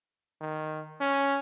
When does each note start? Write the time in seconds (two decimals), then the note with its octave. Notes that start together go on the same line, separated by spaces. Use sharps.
0.41 D#3
1.01 C#4